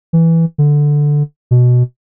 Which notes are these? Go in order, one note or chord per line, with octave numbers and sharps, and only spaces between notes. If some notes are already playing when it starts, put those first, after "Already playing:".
E3
D3
B2